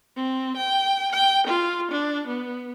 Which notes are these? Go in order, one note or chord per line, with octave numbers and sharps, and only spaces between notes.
C4
G5
G5
F4
D4
B3